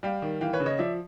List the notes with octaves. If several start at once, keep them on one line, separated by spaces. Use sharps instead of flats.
G3 F5 G5
D#3
E3 F5 G5
B4 C#5
C#3
C#5 D#5
F3 D5 E5